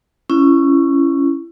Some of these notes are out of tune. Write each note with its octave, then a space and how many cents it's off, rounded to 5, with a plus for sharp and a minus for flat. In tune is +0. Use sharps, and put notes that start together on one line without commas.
C#4 +0 E4 +25